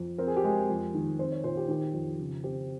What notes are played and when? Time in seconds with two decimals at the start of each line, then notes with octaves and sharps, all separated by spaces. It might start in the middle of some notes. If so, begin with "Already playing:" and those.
Already playing: F2
0.18 C4 A#4
0.27 G#4
0.37 G4
0.44 G#3 G#4
0.69 F2
0.94 D#3
1.19 C4 C5
1.32 C#5
1.43 A#2 C5
1.57 G4
1.68 D#3 G4
1.94 F2
2.20 C#3
2.44 C4 G4